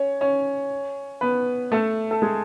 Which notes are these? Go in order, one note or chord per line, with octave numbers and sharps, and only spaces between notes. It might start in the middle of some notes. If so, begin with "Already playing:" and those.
Already playing: C#4 C#5
C#4 C#5
B3 B4
A3 A4
A4
G#3 G#4